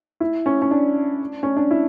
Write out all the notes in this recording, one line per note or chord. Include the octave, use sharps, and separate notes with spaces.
E4
C#4
C#4
D4
C#4
D4
E4